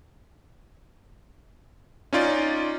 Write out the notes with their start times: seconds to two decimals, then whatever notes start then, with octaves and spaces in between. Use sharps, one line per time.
2.13 C#4 D#4 F4 D5